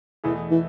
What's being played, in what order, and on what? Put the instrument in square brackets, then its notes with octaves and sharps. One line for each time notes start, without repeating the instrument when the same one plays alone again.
[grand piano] E2 B2 A3 E4 G#4 [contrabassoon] E3
[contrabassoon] E3